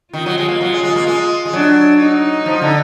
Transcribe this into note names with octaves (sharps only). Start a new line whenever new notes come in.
D#3 F4
F#3
G#3
A#3
F#3
G#3
G#3
A#3
G#3
G#3
F#3 D4
D#4
F3
D3